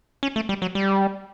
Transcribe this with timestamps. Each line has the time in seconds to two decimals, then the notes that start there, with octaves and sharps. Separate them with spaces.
0.23 C#4
0.36 A3
0.49 G3
0.62 F#3
0.75 G3